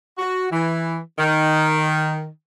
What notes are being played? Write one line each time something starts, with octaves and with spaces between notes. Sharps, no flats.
F#4
E3
D#3